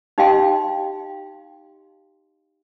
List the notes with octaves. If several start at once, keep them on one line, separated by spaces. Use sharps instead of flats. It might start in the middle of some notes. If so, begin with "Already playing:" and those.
D#4 G4 D#5 F5 G5 C6